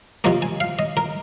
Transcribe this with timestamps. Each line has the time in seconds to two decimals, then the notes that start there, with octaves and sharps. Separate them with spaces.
0.24 C3 F3 A#3 D#5
0.42 G#5
0.60 F5
0.79 D#5
0.97 A#4